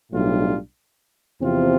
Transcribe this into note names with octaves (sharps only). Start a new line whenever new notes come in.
B1 A2 G3 D4 F4
E2 C3 F3 C4 F4